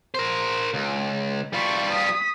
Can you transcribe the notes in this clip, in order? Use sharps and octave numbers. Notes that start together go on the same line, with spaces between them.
A#4 C5
C#2
G3 F4 B5 C#6
D#6 B6